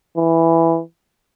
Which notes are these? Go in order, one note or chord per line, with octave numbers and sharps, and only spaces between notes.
E3